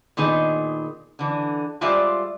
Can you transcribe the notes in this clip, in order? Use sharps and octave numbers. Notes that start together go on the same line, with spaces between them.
A#2 D#3 B3 D#4 G#4
D3 E3
G3 G#3 F4 C5 D5 E5